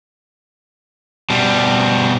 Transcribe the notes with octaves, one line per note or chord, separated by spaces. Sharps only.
B2 G3